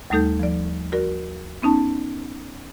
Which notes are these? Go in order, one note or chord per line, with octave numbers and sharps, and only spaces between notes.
D#2 G3 A3 D#4 A4 G6
F3 D5
F#4 A#4 D5
B3 C#4 D#4 A5